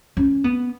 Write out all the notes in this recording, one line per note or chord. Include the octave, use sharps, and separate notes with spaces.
C#4
B3